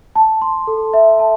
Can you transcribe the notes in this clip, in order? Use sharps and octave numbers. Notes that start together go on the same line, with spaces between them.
A5
C6
A4
E5
A5